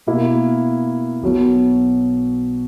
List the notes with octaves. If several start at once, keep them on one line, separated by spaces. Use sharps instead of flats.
B2 A#3 E4
B1 B2 F#3